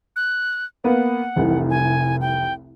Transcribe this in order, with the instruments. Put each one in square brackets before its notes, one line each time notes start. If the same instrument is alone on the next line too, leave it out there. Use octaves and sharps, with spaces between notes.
[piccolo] F#6
[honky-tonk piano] A#3 B3 [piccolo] F#5
[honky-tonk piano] F1 C2 E3
[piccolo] G#5
G5